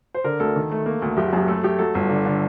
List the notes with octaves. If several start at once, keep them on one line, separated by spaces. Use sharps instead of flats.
C5
D3 A#4
D2 A4
D#3
A3
A#3
D2
F#1 G4
F#4
F#2 G4
A3 A4
A3 G4
F#3 A4
G1
D3
D3